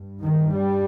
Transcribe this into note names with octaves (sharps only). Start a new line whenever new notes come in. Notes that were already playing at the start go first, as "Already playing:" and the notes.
Already playing: G2
D#3
G3